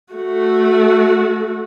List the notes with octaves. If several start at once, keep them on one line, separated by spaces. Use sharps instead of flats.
A3 F#4